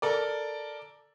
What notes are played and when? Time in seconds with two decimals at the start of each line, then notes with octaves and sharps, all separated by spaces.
0.02 A4 A#4 D5